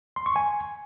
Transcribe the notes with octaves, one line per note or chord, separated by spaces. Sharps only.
C6
C#6
G#5